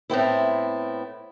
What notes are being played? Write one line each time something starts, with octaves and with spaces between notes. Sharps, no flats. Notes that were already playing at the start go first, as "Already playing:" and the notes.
A2 B3 C4 E4